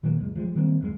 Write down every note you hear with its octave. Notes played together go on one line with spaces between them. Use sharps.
A#2 D#3 F#3 A#3
C#2 F#2 G#3
F3 F#3 G#3
D#3 G3 A#3 C4
D1 F#2 G#3